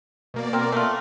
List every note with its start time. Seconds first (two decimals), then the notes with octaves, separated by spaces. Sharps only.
0.34 B2 A#3 D5
0.53 C4 A#4
0.72 A3 F4